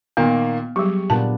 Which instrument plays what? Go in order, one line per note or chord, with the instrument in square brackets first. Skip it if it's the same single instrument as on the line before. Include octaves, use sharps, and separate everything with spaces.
[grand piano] A#2 D#3 A#3 [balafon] B3
[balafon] F#3 G3 [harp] G4 G#4 [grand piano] C#6
[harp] A#2 B3 D4 [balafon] A5